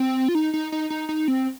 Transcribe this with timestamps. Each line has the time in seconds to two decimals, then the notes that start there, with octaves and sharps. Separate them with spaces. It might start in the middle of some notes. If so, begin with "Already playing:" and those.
Already playing: C4
0.28 F4
0.35 D#4
0.54 D#4
0.72 D#4
0.90 D#4
1.09 D#4
1.28 C4